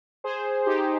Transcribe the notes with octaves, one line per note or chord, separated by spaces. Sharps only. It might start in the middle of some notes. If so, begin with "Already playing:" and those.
G#4 C5
D#4 G4